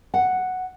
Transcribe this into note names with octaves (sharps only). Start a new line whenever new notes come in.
F#5